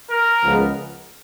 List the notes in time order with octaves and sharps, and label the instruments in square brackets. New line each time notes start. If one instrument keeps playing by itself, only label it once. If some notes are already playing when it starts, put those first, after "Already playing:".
[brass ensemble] A#4
C#2 C#3 F3 G#3 B3